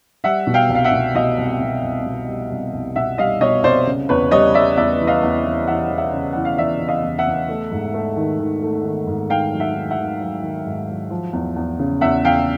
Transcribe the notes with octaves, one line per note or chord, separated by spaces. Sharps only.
G3 E5 F#5
B2
F5 G5
C2
F5
E5 F#5
B2
B2 D#5 F5
C2
B2
C2
B2
G3
C2
C2
B2 E5 F#5
G3 D#5 F5
B2 C#5 D#5
C2 C5 D5
C#3
E2 B4 C#5
G3 C#5 D#5
G3 D5 E5
E2 D5 E5
E3
D#5 F5
E2
E3
E3 E5 F#5
E3
E5 F#5
C#3
E3 F#5
F5
E3 D5 E5
C#3
D#5 F5
E2
E5 F#5
E2
A3
G#2
A3
D#3
D#3
A3
D#3
G#2
D#3 F5 G5
F#3
E5 F#5
D#3
E5 F#5
D#3
F#3
D#3
G#2
F#3
F3
E2
E2
C#3
E2 E5 F#5
E2 F5 G5